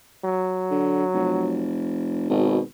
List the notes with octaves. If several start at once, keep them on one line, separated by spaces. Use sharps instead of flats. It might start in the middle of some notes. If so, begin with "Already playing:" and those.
F#3
D3
F1
G#1 B2